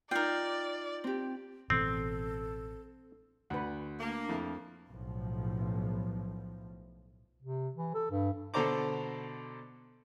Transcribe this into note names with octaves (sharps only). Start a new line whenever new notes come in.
D#4 F4 A#4 D5 G5
C4 G4
A1 B2 E3 C4 A4
D2 B4 F#5
A3 A#3 D4
F2 E4
B1 A2 F3
C3
E3
A4
G2
B2 D3 A4 C5 A#5 D6